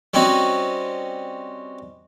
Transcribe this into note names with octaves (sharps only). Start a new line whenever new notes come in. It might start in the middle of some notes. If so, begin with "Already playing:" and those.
G3 C4 C#4 D#4 F#4